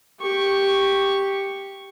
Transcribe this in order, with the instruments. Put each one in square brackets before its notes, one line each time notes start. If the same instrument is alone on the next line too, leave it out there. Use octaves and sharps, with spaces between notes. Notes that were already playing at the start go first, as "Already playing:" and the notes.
[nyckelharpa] G4 C#6